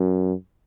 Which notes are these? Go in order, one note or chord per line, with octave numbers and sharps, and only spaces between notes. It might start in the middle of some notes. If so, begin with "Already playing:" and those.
Already playing: F#2